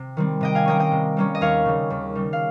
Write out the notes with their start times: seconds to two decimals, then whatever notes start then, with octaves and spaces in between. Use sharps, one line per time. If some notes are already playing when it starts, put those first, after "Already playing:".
Already playing: C3
0.17 D#3 G3 C4
0.41 C3 D#5 G5
0.55 F5 G#5
0.65 G3 A#3 C#4 D#5 G5
0.80 D#5 G5
0.92 C3
1.17 G3 A#3 C#4
1.35 D#5
1.41 D#2 C#5 F5
1.66 C#3 G3
1.90 D#2
2.15 C#3 G3
2.33 F5